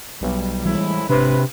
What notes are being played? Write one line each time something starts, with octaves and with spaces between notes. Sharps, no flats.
B1 G3
A2 E3 G3 G#3 E4
G#1 C3 D4 B4